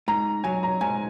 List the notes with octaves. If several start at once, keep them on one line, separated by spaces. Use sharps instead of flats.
G#2 A#5
F#3 G#5
A#5
G#2 G#5